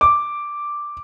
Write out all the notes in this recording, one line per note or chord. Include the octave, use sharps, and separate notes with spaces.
D6